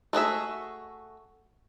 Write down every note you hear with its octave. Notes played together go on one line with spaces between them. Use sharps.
A3 F#4 G#4 E5